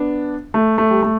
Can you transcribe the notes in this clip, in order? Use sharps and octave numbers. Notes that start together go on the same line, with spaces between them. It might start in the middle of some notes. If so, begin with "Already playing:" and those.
Already playing: B3 D4
A3
A3
G3
A3